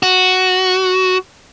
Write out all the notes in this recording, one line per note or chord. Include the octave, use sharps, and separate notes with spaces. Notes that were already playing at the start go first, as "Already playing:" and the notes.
F#4